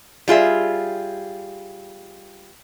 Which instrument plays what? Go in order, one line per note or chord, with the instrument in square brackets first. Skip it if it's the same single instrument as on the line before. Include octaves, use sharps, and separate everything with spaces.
[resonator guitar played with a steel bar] G3 F4 G#4 E5